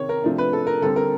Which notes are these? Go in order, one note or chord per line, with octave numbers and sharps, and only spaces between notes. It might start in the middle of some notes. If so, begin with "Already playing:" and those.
Already playing: C3 D#3 C#5
A#4
C3 F3 A3 D4
B4
A4
A#4
D3 G3 C4 A4
A#4